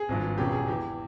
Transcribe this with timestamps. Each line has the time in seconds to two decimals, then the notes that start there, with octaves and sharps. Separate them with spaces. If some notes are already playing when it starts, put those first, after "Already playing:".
Already playing: G#4
0.09 G#1 G2 F3
0.38 E1 E2 C#3 F3 G4
0.52 G#4
0.67 E2 E3 G4